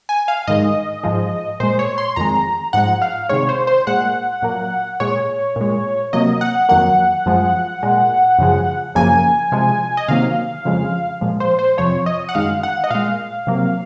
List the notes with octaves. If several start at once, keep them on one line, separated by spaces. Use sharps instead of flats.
G#5
F5
G#2 D#3 G#3 D#5
G#2 F3 G#3
A#2 G#3 C5
C#5
C6
F2 D#3 G#3 A#5
G#2 F3 G#3 F#5
F5
C3 D#3 G#3 C#5
C5
C5
A#2 G#3 F#5
A#2 F#3 A#3
A#2 G#3 C#5
A#2 G#3
C3 F#3 A#3 D#5
F#5
F2 D#3 F#3 A#3 F#5
F#2 F3 G#3
A#2 G#3
F#2 C#3 F3 G#3
F#2 C#3 F3 A#3 G#5
C3 F3 G#3
D#5
C3 D#3 F#3 A#3 F5
F2 C#3 F3 G#3
A#2 F3 G#3
C5
C5
F2 C3 F3 C#5
D#5
F#5
F#2 D#3 G#3 F5
F#5
D#5
A#2 G#3 F5
C3 F#3 A#3